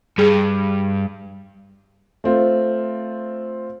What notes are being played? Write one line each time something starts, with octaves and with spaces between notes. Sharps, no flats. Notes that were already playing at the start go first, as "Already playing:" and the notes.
G2 G#4
A3 C4 F4